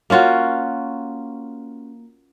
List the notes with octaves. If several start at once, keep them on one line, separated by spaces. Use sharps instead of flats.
A#3 C#4 F4 F#4